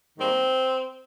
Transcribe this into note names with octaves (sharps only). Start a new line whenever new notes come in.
G#2 D#3 G3 A#3 C4